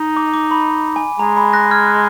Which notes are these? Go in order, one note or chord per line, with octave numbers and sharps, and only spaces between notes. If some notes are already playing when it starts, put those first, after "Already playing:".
Already playing: D#4
D6
D6
B5
G#5
G#3 A#5
B5
F#6 A#6
F6 G#6
F#6